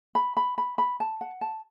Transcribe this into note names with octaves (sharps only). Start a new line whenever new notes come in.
B5
B5
B5
B5
A5
F#5
A5